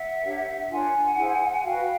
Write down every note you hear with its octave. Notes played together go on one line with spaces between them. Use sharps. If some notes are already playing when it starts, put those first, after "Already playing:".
Already playing: E5 F#5
D4 G4 A#4 C#5
D4 F4 A#4 C#5 F#5 G#5
E4 G#4 C5
G#5
F#4 B4 F5 G5